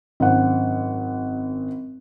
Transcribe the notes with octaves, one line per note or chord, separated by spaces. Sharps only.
G#1 F#2 C5 F#5